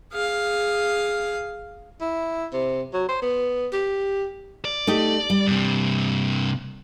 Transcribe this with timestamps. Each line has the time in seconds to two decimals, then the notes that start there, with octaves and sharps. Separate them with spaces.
0.13 G#4 F5
2.01 E4
2.53 C3
2.93 F#3
3.09 C5
3.22 B3
3.73 G4
4.65 D5
4.87 A3 D#4 G4
5.30 G3
5.47 G2 C3